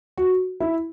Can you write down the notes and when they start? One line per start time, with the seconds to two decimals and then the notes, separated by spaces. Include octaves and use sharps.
0.18 F#4
0.60 E4